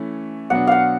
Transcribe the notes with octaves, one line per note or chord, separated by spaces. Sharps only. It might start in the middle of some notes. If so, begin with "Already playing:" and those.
Already playing: E3 A3 C#4 E4
B2 F#3 B3 D4 F#5
F5 F#5